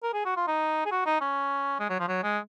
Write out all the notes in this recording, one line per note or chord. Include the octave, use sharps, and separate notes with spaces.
A#4
G#4
F#4
F4
D#4
G#4
F#4
D#4
C#4
G#3
F#3
F3
F#3
G#3